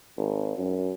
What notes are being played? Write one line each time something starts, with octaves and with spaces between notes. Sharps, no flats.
G#1
F#2